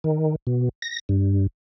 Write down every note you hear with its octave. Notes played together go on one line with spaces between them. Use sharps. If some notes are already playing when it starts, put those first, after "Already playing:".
D#3
B2
A#6
G2